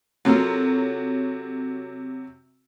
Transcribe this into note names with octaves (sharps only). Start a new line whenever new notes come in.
C3 F#3 F4 A4 A#4